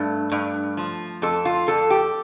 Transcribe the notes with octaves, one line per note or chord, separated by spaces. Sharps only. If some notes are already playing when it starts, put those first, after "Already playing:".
Already playing: G2 A3
G2
F3
F2 A4
F4
F2 A4
G4